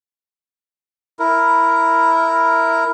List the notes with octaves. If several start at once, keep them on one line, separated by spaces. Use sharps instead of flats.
E4 A#4